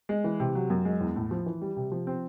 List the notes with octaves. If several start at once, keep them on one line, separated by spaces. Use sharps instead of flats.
G#3
E3
C3
F#3
F#2
G#3
E2
A2
F3
E3
G3
C3
F3
C4